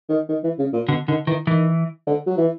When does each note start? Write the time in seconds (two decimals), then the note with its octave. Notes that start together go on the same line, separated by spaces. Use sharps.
0.09 D#3
0.29 D#3
0.44 E3
0.59 C#3
0.73 A#2
0.88 B2 D3
1.08 D3 D#3
1.27 D#3 E3
1.47 D#3 E3
2.07 D3
2.27 F#3
2.37 E3